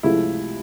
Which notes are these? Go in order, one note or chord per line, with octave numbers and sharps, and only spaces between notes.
C#2 C3 F3 A3 E4